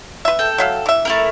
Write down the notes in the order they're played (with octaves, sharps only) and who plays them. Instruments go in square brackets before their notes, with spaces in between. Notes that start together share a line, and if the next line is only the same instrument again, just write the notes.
[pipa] B4 E5
[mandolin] A4 G5
[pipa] F#3 E5 F5
E3 E5
[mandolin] A3 E4 A#4